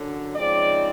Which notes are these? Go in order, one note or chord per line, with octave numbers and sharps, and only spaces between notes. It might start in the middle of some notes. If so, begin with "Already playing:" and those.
Already playing: F#2 D3 F#3
C#3 F3 G#3 C4 D#4 D5